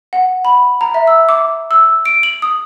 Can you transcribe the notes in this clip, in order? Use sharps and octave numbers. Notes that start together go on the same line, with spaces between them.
F#5
B5
A#5
E5
E6
D6
E6
D7
F#7
D#6